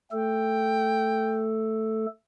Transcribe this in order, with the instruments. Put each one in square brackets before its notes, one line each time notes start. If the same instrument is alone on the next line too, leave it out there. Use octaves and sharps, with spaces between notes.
[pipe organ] A3 A4 [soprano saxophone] G5